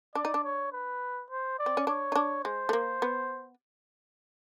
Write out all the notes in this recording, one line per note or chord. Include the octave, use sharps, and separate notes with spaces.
D4 D5
D#4
D4
C#5
B4
C5
D5
C4
C#4
D4 C#5
D#4
D4
G#3 C5
A3
A#3
B3